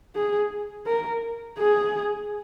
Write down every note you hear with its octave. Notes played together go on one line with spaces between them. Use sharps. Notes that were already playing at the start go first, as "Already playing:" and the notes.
G#4
A#4
G#4